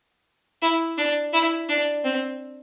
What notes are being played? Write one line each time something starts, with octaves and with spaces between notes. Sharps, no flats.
E4
D4
E4
D4
C4